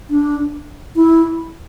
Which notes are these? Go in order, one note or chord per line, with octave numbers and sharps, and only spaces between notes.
D4
E4